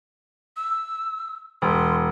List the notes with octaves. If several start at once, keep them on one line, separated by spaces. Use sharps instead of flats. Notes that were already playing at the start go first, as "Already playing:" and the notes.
E6
E1 C6